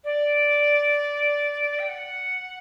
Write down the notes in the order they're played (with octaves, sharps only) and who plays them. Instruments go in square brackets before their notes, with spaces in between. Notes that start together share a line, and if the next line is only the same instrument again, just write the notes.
[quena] D5
G5
F#5